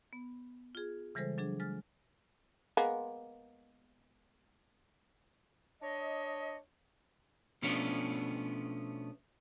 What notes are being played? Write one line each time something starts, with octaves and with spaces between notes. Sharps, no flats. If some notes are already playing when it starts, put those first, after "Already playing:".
B3
F4 G#4
C#3 E3 G3 G#3 A4 C5
F#3 D4 G#4
G#3 F6 A6
G#3 A#3 B3
D4 C#5 D#5
B2 F3 A3 B3 C#4 D4